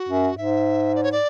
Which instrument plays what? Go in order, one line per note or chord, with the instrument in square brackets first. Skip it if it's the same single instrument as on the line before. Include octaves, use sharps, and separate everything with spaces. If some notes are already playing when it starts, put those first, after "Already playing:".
Already playing: [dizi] F#4
[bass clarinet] F#2
[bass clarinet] G#2 [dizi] E5
[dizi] D5
C#5
D5